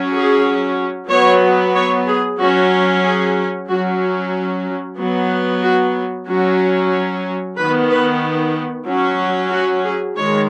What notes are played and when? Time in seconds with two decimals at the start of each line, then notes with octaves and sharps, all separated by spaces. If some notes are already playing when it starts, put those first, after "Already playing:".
Already playing: F#3 C#4
0.12 G#4
1.09 F#3 B3 C#5
1.75 C#5
2.07 G#4
2.39 F#3 C#4 F#4
3.04 G#4
3.69 F#3 C#4 F#4
4.98 F#3 B3
5.63 F#4
6.28 F#3 C#4 F#4
7.57 D#3 B3 B4
7.90 B4
8.88 F#3 C#4
9.52 F#4
9.84 G#4
10.17 D#3 G#3 C#5